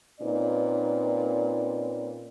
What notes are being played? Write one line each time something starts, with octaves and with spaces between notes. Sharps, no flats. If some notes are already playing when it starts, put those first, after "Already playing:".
A#2 C4 C#4 D#4 B4 D5